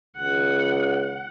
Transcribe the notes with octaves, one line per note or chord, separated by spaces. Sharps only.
C#2 F#5